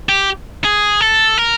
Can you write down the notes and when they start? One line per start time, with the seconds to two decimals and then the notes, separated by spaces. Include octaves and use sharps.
0.09 G4
0.64 G#4
1.01 A4
1.38 A#4